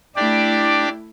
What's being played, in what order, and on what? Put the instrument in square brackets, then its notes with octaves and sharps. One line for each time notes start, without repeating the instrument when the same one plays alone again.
[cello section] A3 E4 [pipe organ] D4 G4 D5